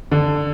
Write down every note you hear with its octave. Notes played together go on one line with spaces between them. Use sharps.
D3